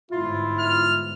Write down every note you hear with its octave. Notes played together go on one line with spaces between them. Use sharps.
G1 G#2 E4 F4
F6